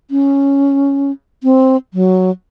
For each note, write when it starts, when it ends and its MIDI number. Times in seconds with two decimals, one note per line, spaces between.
0.11 1.11 61
1.43 1.77 60
1.94 2.31 54